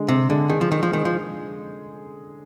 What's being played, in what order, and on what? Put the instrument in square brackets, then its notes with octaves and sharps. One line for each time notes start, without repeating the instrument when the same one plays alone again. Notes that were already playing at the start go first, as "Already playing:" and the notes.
Already playing: [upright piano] D3 G#3
[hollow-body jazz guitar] C3 [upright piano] G#4
[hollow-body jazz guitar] D3 [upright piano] G#3
[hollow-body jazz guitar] D#3 [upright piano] G#4
[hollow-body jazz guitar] F3
[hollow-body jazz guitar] D#3 [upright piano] G#4
[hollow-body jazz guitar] F3
[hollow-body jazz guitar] D#3 [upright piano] G#3
[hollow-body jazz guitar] F3